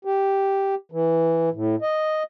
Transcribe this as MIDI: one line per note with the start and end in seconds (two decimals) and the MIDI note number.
0.05 0.75 67
0.92 1.49 52
1.53 1.76 45
1.82 2.23 75